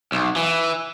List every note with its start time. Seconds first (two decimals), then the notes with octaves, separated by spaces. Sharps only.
0.12 B1
0.36 E3